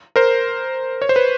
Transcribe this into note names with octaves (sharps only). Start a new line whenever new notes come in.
A#4 C5
C#5
C5
B4